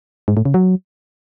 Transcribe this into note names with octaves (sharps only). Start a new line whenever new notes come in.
G#2
A2
C#3
F#3